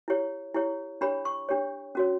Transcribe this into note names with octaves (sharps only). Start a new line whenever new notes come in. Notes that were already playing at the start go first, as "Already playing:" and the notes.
E4 G4 C#5
E4 G4 C#5
D4 G4 C#5 B5
C#6
D4 G4 C#5
C#4 F#4 C#5